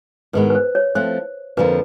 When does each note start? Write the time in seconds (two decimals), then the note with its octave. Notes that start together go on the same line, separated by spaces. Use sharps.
0.33 G#2 D#3 G#3 B3 B4
0.50 B4
0.55 C5
0.75 C#5
0.95 F3 A3 C4 C5
1.57 F2 D3 F3 A#3 B4